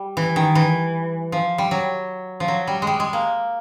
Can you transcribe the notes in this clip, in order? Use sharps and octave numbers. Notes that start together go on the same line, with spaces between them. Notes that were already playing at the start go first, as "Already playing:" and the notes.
Already playing: G3
E3
D#3
E3
F3
G3
F#3
F3
F#3
G3
G#3
G3
G#3
A#3